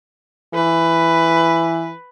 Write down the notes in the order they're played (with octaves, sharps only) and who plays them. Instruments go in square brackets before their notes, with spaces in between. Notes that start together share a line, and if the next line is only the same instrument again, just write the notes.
[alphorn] E3 [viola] B4